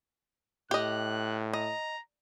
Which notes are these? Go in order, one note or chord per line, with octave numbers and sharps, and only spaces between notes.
A2 G4 D#5 F#6
D#5 A#5